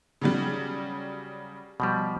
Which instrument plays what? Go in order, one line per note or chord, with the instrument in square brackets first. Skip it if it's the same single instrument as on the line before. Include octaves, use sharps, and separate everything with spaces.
[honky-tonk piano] C#3 F#3 G3
[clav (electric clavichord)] B2 F3 G3